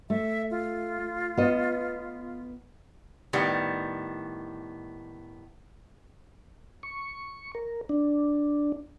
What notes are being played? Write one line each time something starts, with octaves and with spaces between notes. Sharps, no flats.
A3 E5
F4
B3 D#5
A2 D#3 G3 B3
C#6
A#4
D4